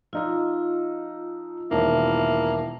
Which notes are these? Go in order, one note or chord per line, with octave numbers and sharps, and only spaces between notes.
F3 D#4 F4 D#5 E6
E1 D#3 A#3 E4